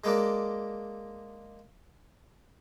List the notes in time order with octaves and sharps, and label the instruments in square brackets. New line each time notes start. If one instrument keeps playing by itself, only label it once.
[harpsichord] G#3 A#3 D4